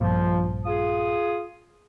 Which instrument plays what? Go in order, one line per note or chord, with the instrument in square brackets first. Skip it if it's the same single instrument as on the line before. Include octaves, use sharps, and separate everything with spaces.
[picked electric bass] A#1 G2 A#2 [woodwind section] F3
[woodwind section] F4 G#4 D#6